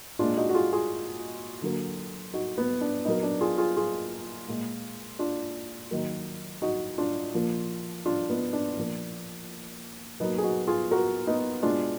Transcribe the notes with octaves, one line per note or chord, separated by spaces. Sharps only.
A#2 G#3 D4 F4
D#4 F#4
F#4
F4 G#4
F4 G#4
D3 F#3 A#3
D#4 F#4
B3
D4
A#2 F#3 A#3 B3 D#4
D4
F4 G#4
F4 G#4
F4 G#4
A#2 G#3
D4 F4
D#3 F#3 A#3
D#4 F#4
D4 F4
A#2 F3 A#3
D4 F4
B3 D#4
D4
A#2 F3 A#3
B2 F#3 A#3 B3 D#4
G#4
D#4 F#4
F4 G#4
F#4 A#4
B3 D#4
B2 G#3 D4 F4